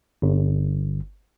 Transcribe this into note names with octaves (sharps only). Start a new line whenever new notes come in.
G1